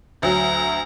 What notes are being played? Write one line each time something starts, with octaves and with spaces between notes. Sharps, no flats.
D2 F#3 A#5